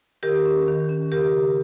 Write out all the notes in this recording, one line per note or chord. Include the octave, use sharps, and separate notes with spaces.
D#3 G4 A#4
C#4
D#3
C#4
C#3 G4 A#4
C#3